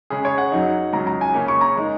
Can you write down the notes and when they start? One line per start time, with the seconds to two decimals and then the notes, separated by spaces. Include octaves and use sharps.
0.10 C#3 G#3 C#4 G#4
0.25 C#5
0.38 F#5
0.52 F#2 F#3 D#4
0.93 C#2 C#3 F#3 A#5
1.07 A#5
1.21 G#5
1.34 C#3 A#3 C#4
1.48 C#6
1.61 A#5
1.77 G#3 D#4